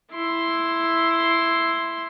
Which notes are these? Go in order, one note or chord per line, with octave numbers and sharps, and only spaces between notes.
E4 C6